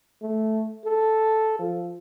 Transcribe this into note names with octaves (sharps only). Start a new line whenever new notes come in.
A3
A4
F3